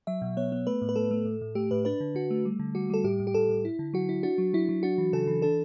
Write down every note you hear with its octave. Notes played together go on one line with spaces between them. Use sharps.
F#3 E5
B2
B3 C#5
B3
A3 B4
A2
B4
A3 A4
A3
A2
A2
A3 G4
A2 B4
D4 B4
D3
D3 F#4
A3
G3
D3
G3 F#4
G3 A4
A2 G4
A2
G4
A2 A4
A2
E4
D3
F#3 F#4
E4
D4 F#4
F#3
F#3 E4
F#3
D4 F#4
E3
C#3 A4
E3
D4 A4